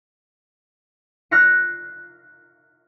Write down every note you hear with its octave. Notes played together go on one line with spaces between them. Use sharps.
F6 F#6 A#6 C7 C#7